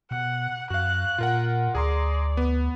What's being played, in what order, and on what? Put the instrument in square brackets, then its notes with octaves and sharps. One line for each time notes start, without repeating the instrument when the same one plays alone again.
[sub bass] B2 [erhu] F#5
[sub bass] F#2 [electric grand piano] F#4 F5 [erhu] F#6
[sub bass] A#2 [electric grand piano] F4 A#4 F#5
[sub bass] D2 [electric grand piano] G#4 A#5 C6 [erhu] D5
[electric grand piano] B3